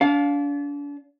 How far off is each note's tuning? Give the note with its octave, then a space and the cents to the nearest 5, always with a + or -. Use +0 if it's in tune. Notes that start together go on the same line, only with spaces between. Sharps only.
D4 -35 F5 +15